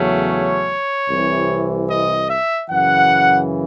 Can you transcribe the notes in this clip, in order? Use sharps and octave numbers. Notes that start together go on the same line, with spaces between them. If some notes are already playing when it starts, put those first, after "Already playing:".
Already playing: E2 C#3 F#3 A3 C#4
C#5
C2 C3 E3
D#5
E5
F#2 C#3 E3 F#5